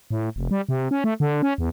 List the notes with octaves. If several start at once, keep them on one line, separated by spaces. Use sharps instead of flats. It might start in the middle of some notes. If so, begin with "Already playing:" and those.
A2
F1
G3
C3
C#4
A3
D3
C#4
E2